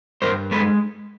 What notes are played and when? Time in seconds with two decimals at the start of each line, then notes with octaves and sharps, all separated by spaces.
0.22 G2 A#4 C5
0.51 G#3 A4 B4